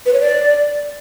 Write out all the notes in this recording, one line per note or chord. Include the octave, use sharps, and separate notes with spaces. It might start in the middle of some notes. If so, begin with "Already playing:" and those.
B4
C#5
D5